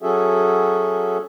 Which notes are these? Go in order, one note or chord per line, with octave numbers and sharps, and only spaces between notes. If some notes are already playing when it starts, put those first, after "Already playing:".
F#3 C#4 F#4 G#4 A4 E5